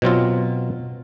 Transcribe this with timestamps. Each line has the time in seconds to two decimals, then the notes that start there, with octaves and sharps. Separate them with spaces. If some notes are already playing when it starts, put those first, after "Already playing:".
0.02 B2 F#3 C4 F4